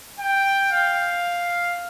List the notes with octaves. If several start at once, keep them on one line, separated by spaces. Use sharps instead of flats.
G5
F5